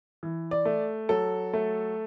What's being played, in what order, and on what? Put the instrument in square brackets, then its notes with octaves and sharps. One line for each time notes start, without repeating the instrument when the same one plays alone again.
[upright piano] E3
D5
A3
F#3 A4
A3